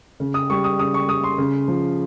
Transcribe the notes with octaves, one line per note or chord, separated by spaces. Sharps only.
C#3
D#6
G3 C#6
D#6
C#3 D#6
C#6
G3 D#6
C6
C#3
F3